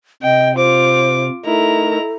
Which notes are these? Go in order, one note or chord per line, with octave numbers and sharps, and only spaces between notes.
C3 D#5 G5
F4 C5 D6
A3 D#4 E4 A4 A#4 A#5